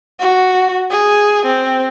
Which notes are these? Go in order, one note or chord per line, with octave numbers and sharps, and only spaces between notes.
F#4
G#4
C4